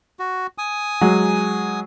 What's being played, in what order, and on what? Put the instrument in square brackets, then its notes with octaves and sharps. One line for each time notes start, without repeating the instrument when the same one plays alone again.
[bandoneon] F#4
G#5 D#6
[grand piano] F#3 G#3